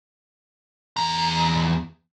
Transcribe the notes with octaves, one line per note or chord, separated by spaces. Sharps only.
E2 A#5